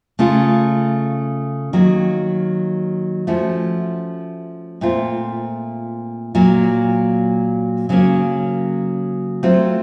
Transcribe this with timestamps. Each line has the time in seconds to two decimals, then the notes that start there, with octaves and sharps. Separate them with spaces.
0.19 C#3 A3 C#4 F4
1.73 D#3 F#3 A#3
3.27 F3 A3 C#4 F#4
4.81 A#2 A3 C4 F4
6.35 A#2 F#3 A#3
7.89 C#3 F#3 A#3 C#4
9.43 F#3 A3 C4 F4